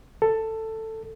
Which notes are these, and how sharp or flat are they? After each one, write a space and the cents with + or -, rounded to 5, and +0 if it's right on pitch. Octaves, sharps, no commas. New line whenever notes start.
A4 +10